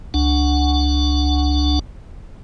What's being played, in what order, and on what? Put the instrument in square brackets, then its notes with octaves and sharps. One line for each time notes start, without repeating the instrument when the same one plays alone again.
[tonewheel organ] C#2 D4 F#5